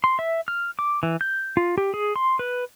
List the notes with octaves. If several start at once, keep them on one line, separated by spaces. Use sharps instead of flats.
C6
E5
F6
D6
E3
G6
F4
G4
G#4
C6
B4